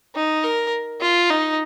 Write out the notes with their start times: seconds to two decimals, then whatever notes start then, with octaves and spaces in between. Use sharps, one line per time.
0.15 D#4
0.44 A#4
1.01 F4
1.30 D#4